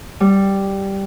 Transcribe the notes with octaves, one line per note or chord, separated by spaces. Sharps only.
G3